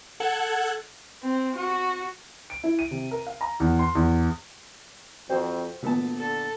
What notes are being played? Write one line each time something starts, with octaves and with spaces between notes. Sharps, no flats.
A4 F#5 F#6 G#6
C4
F#4
D7
E4
D#7
C3
A#4
F5
A#5
E2
C6
E2
F2 F#4 C5 G5
D2 A#2 B3 A5
D3 A4